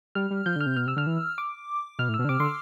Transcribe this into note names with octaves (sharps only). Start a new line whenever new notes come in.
G3 F6
G3
F3 G6
D3
F6
C3
B2 F6
C3 E6
D3 F6
E3
D6
B2 F6
A2
E6
B2
D3
C3 D6
D3 C6